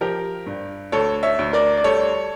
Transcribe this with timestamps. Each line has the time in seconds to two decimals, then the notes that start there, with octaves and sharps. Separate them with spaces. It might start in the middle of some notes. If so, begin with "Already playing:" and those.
0.01 F3 G4 A#4
0.46 G2
0.92 D2 A4 C#5
1.23 C#5 E5
1.39 D2
1.53 A#4 D5
1.77 D5
1.84 G3 A4 C#5